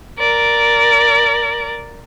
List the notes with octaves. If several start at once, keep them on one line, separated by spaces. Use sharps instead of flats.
A#4 D5